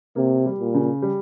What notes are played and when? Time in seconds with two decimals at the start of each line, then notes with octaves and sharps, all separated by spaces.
0.16 C3 A#3
0.46 G3
0.60 A#2
0.74 C#3
1.02 G3